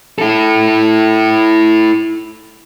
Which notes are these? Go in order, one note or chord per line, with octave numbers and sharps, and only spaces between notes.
E4 A4